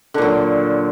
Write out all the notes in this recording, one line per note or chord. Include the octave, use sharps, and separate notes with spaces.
A#2 D3 F#3